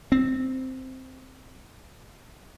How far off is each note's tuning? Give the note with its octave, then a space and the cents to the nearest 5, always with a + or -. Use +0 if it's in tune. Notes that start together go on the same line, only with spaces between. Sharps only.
C4 -5